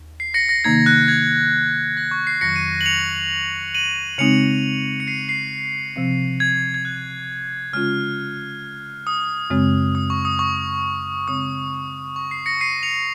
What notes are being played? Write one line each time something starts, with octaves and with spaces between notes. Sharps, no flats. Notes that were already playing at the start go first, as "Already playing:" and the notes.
Already playing: D#2
C7
A#6 C#7
A#6
C3 D#3 A#3 D#4 G#6
F#6
G#6
A#6
C#6
C7
F2 D#3 F#3 A#6 C#7
C7 D#7
F#7
C#7 F7
D#7 F#7
C#3 G#3 C4 D#4 C#7 F7
C#7
C7 D#7
C7
C3 F3 C4
G#6
G#6
F#6
C#3 G#3 C#4 F4 F6
D#6
F#2 C#3 G#3 C4
D#6
C#6
D#6
C#6
C#3 G#3 C4 D#6
C#6
C7
A#6 C#7
C7 D#7
C#7 F7